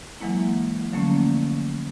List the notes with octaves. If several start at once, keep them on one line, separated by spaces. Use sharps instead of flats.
E3 F#3 G#3 A#3 E4
D3 F3 F#3 A3 A#3 C#4